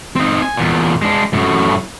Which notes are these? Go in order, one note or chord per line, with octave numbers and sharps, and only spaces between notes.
C4 D#4
G#5
E2 A#2
G#3 D4
F#2 A2